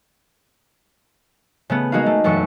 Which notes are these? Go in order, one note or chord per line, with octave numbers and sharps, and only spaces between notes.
C#3 A3 B3
G#3 A#3 D#4 F#4 G#4 F5
A3
E1 F#2 A3 C#6 C#7